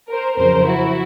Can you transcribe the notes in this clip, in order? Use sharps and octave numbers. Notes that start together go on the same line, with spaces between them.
A#4 C5
F2 C#3 F#3 A#4 C5
E4 F#4